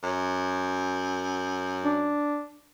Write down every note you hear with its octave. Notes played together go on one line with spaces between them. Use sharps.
F#2
D4